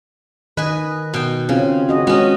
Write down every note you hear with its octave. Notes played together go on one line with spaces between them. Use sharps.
D#3 B4 D#5 G#5
B2 G5
C#3 C4 F4
F#4 D#5
G#3 B3 C#4 F#4 D#5